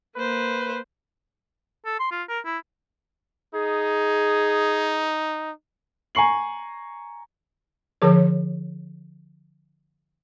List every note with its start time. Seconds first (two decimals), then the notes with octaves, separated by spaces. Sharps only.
0.16 A#3 B4 C5
1.85 A4
2.00 C6
2.11 F4
2.29 A#4
2.45 E4
3.54 D#4 G#4
6.15 G#5 A#5 C#6 C7 F#7
8.02 D3 F3 G#4 C#5